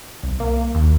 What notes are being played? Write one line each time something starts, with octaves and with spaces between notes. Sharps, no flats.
C2
A#3
D#2